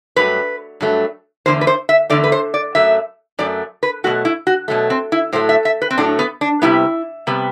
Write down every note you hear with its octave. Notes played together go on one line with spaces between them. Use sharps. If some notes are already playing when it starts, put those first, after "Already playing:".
G2 F#3 A3 B4
G2 F#3 A3
E2 D3 A3 C5
B4
C5
E5
E2 D3 A3 D5
B4
C5
D5
F#2 F#3 A3 E5
F#2 F#3 A3 D5
B4
B2 F#3 A3 F#4
E4
F#4
B2 F#3 A3
C4
E4
A2 F#3 A3 C5
E5
E5
B4
C4
A2 F#3 A3 D4
B3
D4
C3 G3 B3 E4
C3 G3 B3